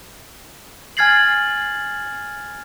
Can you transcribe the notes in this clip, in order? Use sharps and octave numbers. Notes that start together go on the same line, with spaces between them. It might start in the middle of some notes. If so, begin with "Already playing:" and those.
G#5 F6 G#6 A6 C7 F#7